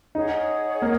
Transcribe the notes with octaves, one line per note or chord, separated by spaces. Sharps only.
D#4 G#4 C#5 F#5
A#3